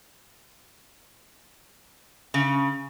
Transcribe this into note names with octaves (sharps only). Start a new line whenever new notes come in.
C#3